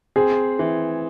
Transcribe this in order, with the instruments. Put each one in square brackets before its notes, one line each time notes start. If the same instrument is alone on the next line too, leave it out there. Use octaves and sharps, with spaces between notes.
[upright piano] C4 [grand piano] G#4
[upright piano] E3